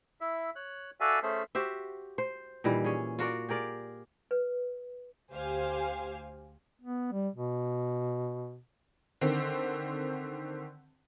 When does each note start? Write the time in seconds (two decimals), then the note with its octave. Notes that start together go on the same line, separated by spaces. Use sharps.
0.21 E4 E5
0.56 C#5 F#6
1.00 F#4 A4 D5 E5 F5 G#5
1.23 A3 C#4 G#4 A4 C5 E5
1.55 F#4 G4 C5 E5
2.18 C5
2.64 A#2 D#3 E3 G3
2.84 C#4 G#4
3.19 F4 F#4 A#4 D5
3.49 G4 G#4 A#4 D5
4.31 B4
5.32 D2 G4 C5 F5 G#5
6.82 B3
7.12 G3
7.36 B2
9.21 D3 D#3 C4